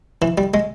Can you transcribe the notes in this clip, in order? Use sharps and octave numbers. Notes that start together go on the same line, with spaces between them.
E3
G3
G#3